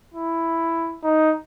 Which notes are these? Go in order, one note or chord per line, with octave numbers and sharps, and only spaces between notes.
E4
D#4